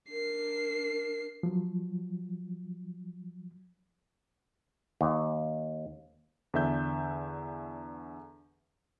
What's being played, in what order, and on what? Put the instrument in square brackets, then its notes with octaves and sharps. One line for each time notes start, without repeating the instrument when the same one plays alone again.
[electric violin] D4 C7 [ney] A#4
[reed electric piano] F3 F#3
[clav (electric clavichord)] D#2
[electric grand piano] E2 D3 E5 G6